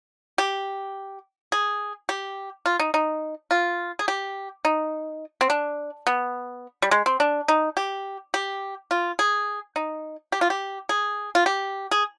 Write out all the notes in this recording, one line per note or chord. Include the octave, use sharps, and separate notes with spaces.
G4
G#4
G4
F4
D#4
D#4
F4
G#4
G4
D#4
C4
D4
B3
G3
G#3
C4
D4
D#4
G4
G4
F4
G#4
D#4
G4
F4
G4
G#4
F4
G4
G#4